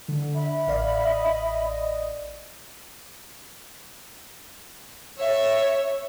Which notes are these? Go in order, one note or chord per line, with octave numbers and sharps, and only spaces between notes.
D3
E5 B5
A1 D5 F5
D#5
C#5 E5